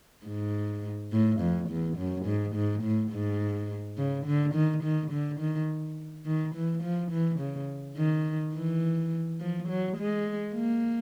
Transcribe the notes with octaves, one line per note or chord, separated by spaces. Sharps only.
G#2
A2
F2
E2
F#2
G#2
G#2
A2
G#2
C#3
D3
D#3
D#3
D3
D#3
D#3
E3
F3
E3
C#3
D#3
E3
F3
F#3
G#3
A#3